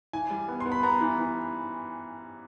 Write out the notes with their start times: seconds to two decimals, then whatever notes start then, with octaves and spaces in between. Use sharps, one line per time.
0.13 E3 G#5
0.30 G3
0.48 B3
0.60 C6
0.66 B3
0.72 B5
0.83 B3 A#5
1.01 E3
1.18 B3